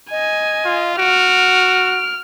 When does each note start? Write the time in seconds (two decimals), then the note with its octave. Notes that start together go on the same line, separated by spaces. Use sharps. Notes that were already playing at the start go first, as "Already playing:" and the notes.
0.11 D#5 G#5
0.65 F4
0.98 F#4 F6 D7